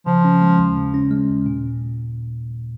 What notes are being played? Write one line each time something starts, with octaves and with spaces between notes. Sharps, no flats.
C#3 F3
C#4
G#3
D#2
C#3
C#4
G#3
D#2
A#2